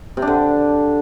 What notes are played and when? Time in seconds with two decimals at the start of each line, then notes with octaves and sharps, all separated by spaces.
0.17 C3
0.22 D4
0.27 D3